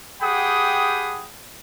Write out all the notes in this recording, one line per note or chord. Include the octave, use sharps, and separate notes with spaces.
G4 G#4 F#5 G5 B5 D#6